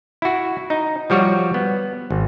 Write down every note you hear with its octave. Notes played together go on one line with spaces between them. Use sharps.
E4 F#4
D#4
F3 G3 F#4 C#5
B3
G#1